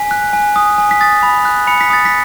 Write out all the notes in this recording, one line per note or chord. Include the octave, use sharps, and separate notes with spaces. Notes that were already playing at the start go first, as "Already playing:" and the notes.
Already playing: G#5 B6
F#6
G#5
D#6
G#5
B6
D#6 A6
B5
F#6
B5 C#7
B6
D#6 A6
B6